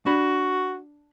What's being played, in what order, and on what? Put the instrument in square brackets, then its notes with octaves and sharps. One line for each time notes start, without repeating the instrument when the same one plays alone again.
[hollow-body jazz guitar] D4 B5 [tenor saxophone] F#4